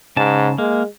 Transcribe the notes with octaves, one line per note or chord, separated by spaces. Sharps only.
G#2 C#3 A5
G#3 A#3